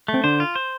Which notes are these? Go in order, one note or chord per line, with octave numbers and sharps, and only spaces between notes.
A3
C4
D3 D4 C5
F4
C5